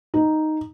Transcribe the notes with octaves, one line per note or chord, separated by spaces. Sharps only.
D#4